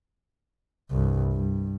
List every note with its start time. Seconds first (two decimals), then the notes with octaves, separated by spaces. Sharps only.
0.91 C2 G2
1.33 G2